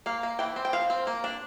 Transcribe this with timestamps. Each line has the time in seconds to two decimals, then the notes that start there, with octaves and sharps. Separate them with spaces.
0.06 A#3 F5
0.23 A#3
0.39 E3 G5
0.56 C4
0.65 G5
0.73 F3 F5
0.90 C4
1.07 A#3
1.24 D4